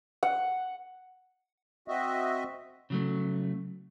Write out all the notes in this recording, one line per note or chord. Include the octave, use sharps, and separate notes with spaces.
F#5
C4 F#4 D#5 E5
C#3 F#3 A3